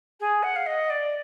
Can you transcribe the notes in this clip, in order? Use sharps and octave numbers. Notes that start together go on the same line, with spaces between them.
G#4
F#5
F5
D#5
D5